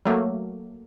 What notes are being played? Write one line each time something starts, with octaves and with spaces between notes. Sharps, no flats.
F#3 A3 A#3